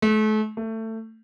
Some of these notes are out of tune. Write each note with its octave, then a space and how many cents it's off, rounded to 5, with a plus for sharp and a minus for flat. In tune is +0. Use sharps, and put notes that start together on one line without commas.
A3 -35
A3 +20